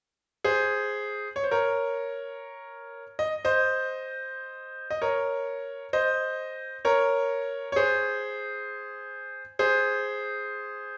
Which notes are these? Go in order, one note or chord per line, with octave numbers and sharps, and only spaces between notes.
G#4 C5
C#5
C5
A#4 C#5
D#5
C5 D#5
D#5
A#4 C#5
C5 D#5
A#4 C#5
C#5
G#4 C5
G#4 C5